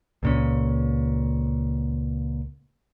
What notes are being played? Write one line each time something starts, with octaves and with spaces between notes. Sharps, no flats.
C#2 A#2 C#4